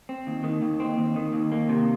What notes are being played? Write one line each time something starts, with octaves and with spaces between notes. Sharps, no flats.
C4
D#2
D#3
D#2
C4
D#2
D#3
D#2
A#3
C3